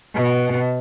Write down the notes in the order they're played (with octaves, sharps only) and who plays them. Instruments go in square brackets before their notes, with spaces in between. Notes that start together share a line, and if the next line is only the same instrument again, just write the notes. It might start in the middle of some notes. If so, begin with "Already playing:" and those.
[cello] B2